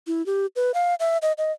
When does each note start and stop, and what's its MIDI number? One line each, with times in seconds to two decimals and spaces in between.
0.07 0.25 64
0.26 0.46 67
0.56 0.72 71
0.74 0.95 77
1.00 1.18 76
1.22 1.33 75
1.38 1.52 75